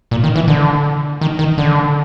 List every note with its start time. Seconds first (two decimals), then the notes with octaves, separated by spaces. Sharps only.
0.11 A#2
0.24 D#3
0.36 E3
0.48 D3
1.21 D#3
1.39 D#3
1.58 D3